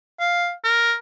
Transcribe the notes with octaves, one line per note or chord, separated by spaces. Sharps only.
F5
A#4